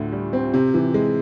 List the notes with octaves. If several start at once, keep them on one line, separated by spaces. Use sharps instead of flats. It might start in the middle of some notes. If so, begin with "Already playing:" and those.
Already playing: D2 A2 D3
G3
C4
C3
E3
G#3